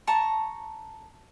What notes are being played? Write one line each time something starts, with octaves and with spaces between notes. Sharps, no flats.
A5 A#5 C#6